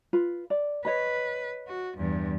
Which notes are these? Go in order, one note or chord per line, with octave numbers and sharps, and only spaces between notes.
F4 B4
D5
B4 C#5 D#5 B5
F#4
E2 G2